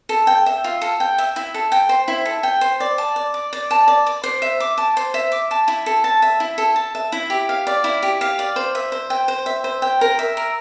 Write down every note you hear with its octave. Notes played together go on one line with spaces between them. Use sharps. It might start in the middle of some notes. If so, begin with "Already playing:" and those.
A4
G5
E5
F4
A4
G5
E5
E4
A4
G5
C5
E4
A4
G5
C5
D5
A5
D5
D6
D5
A5
D5
D6
C5
E5
D6
A5
C5
E5
D6
A5
E4
A4
A5
E5
E4
A4
A5
E5
E4
G4
F5
D5
E4
G4
F5
D5
C5
E5
C5
G5
C5
E5
C5
G5
A#4
E5
A#4